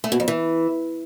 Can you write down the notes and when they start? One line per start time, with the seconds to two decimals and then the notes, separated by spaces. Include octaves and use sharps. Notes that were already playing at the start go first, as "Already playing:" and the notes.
0.04 A3
0.12 B2
0.20 F2
0.28 E3